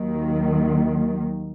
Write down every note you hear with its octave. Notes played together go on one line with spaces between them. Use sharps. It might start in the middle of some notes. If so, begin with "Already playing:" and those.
Already playing: D#2 D#3 F#3